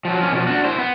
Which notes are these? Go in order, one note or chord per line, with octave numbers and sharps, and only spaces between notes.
F3 F#3
F3 C#4
B2 F3
D4 F#4
E4 C5
B3